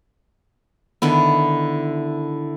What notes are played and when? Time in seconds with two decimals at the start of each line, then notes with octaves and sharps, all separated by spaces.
1.02 D3 D#3 B3 E4